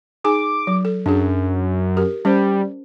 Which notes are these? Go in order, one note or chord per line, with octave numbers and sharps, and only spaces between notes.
D#4 G#4 G#5 D6
F#3
A4
F#2 D4 G#4
G4 A#4
G3 C#4 C5